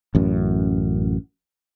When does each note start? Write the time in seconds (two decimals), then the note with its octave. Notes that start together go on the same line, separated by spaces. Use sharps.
0.15 A1 F#2